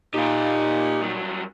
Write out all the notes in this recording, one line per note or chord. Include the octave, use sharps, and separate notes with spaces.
A#2 D#4 G4 F5
G2 F#3